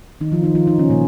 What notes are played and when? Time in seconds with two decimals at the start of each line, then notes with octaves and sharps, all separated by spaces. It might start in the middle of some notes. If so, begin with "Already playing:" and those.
0.21 D#3 D#4
0.32 F3 F4
0.43 D#3 D#4
0.55 F3 F4
0.67 D#3 D#4
0.78 C#3 C#4
0.90 A#2 A#3